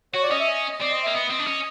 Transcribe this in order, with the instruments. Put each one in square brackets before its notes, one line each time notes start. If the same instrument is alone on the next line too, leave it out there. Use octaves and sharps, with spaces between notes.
[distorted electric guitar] F#4 [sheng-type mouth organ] C#5
[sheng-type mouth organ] D5
[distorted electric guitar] C#4 [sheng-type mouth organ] D#5
[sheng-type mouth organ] E5
D#5
D#5
[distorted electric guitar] C4 [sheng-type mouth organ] D5
[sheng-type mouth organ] D#5
[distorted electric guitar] A#3 [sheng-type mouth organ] E5
[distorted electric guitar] B3 [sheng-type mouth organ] D#5
[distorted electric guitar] C4
D4
C#4